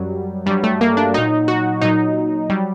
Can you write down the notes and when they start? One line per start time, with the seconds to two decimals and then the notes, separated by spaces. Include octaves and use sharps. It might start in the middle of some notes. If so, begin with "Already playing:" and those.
Already playing: F#2 F#3 G3
0.46 G2 F#3 G3
0.63 A3
0.81 A#3
0.97 D4
1.14 A#2 F#3 D#4
1.48 F#4
1.81 A#2 F#3 D#4
2.50 F#3 G3